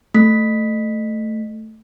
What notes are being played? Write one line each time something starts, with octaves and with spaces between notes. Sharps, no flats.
A3 B6